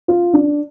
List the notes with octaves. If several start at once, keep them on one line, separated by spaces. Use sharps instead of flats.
F4
D4